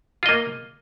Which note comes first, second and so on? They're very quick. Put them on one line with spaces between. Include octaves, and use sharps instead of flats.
F4 D#5 A#3